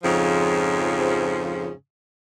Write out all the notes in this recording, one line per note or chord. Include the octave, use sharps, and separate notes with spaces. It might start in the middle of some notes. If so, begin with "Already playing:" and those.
F2 G#2 C#3 F3